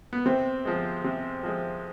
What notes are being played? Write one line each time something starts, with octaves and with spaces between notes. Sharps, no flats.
B3
C3 C4
F3 G#3
C3
F3 G#3